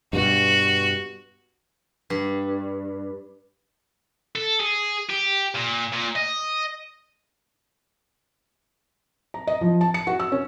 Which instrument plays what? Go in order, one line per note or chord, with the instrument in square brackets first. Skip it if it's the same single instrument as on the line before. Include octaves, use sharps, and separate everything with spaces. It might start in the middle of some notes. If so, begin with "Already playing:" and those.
[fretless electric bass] G2 B2 [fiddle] F#4
[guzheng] G2
[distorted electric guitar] A4
G#4
G4
A#2
A#2
D#5
[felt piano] A#5
D#5
F3
A5
C#7
F#4
E6
C#4